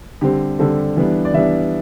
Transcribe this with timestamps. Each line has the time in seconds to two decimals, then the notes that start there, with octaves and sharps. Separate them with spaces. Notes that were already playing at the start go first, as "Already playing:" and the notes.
0.21 D3 G3 C4 G4
0.59 D3 G3 C4 A4
0.97 E3 G3 B3 D4
1.25 D5
1.34 E3 G3 B3 D4 E5